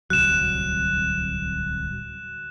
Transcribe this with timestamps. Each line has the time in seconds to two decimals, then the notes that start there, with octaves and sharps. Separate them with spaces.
0.10 D1 C2 F#3 F#6 E7